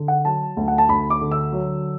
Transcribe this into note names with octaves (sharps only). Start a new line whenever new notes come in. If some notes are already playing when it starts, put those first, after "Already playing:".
Already playing: D3
F#5
F#3 A5
D2
F#5
A5
D2 B5
D6
D3
E6
F#3